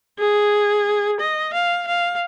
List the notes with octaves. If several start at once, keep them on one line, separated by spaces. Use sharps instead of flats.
G#4
D#5
F5
F5